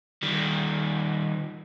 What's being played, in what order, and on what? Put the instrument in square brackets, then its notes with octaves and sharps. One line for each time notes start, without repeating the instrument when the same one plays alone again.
[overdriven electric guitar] D#3 G3